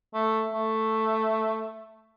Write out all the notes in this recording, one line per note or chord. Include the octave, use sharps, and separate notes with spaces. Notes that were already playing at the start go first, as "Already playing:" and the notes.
A3
A3